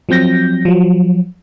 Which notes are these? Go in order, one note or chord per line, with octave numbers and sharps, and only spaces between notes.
F3 F#3 C4 G6 A#6
F3 F#3